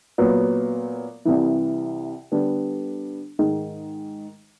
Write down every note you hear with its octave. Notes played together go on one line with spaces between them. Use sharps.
A#2 F#3 B3
C2 C3 E3
D3 G3 B3 D4
G#2 D#3 G#3